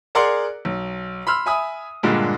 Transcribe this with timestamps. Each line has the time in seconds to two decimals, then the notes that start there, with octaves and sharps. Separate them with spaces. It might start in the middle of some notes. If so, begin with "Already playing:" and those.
0.15 G#4 A#4 D5 F#5 C6
0.65 B1
1.27 B5 C6 E6 F6
1.46 E5 G#5 B5 D#6
2.03 G2 A#2 D3 G3 G#3